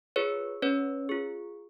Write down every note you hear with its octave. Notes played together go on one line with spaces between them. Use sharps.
F4 G#4 B4 C#5
C#4 B4 C#5
F4 G#4